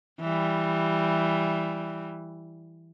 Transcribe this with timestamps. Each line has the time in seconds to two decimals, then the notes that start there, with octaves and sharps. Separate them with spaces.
0.20 E3 G3